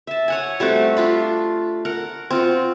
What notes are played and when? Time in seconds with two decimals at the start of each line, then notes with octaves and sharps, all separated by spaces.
0.07 E5 A5
0.28 C#5 F#5 G#5
0.60 G3 A3 C4 F#4
0.97 D4 F4 B5
1.85 A#4 F#5
2.30 C4 F4 F#4